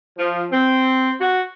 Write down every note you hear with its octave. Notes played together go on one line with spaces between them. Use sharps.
F3
C4
F#4